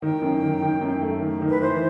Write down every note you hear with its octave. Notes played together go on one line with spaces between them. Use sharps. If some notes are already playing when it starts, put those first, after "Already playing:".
D#3 G5
F#2
D#3
D#3
F#2
A3
D#3
D#3
B4
E3 C5